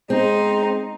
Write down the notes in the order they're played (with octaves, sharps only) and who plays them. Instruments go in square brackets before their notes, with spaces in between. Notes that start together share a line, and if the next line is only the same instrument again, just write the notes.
[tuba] G#3 [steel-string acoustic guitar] C4 [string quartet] D#4 C5